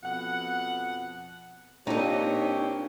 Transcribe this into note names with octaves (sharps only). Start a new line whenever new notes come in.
F2 B2 F#5
A#2 C4 D4 D#4 G4 C#5 D#5